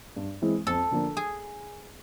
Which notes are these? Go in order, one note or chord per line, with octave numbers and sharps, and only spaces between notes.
G2
E3 G#3 C4 E4
F2 A4
D3 F3 A#3 D4
G#4